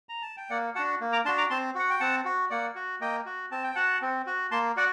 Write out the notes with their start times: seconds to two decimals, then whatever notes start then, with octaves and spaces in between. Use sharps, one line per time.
0.09 A#5
0.22 A5
0.37 G5
0.50 A#3 D5 F#5
0.75 F#4 F#5 A5
0.79 D4
1.01 A#3
1.12 A#5 D6
1.25 D4 F#4 A5 C6
1.37 A#5 D6
1.50 C4 A5 C6
1.75 F#4 F#5
1.90 G5
2.00 C4 F#5 A5
2.25 F#4
2.50 A#3 D5 F#5
2.75 F#4
3.01 A#3 D#5 G5
3.26 F#4
3.51 C4 A5
3.64 G5
3.75 F#4 F#5 A5
4.02 C4
4.27 F#4
4.51 A#3 A5 C6
4.77 F#4 D5 F#5